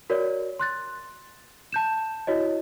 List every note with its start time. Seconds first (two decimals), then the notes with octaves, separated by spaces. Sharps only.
0.10 F#4 A#4 C#5 D5
0.59 C6 F#6 A6
1.73 A5 G6 E7
2.27 E4 F#4 C#5 D#5